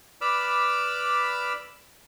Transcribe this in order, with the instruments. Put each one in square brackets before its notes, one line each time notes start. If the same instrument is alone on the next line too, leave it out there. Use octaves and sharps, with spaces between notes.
[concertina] B4 D5 B5 D6 E6 F6